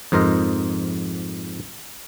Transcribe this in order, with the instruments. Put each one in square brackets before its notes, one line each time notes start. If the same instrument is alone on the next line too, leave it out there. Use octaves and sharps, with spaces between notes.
[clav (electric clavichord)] F2 G#2 A#4 C5 D#5